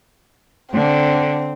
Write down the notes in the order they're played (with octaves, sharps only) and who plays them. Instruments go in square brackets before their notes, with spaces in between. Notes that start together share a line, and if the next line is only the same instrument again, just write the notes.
[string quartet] D3 [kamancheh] C4